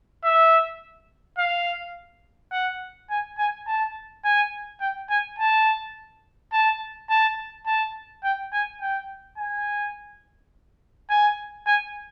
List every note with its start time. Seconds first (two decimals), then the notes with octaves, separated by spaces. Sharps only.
0.24 E5
1.38 F5
2.52 F#5
3.10 G#5
3.38 G#5
3.67 A5
4.25 G#5
4.81 G5
5.10 G#5
5.39 A5
6.53 A5
7.10 A5
7.66 A5
8.24 G5
8.53 G#5
8.81 G5
9.38 G#5
11.10 G#5
11.66 G#5